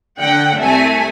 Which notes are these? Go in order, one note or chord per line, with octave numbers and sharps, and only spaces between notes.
D3 F#5 G5
C2 A3 E5 G#5